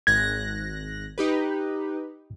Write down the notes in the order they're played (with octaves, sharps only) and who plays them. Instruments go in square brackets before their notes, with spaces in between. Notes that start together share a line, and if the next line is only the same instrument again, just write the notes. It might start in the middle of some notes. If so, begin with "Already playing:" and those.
[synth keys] G#1 F#6 A#6 [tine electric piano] G#6
[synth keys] D#4 G4 B4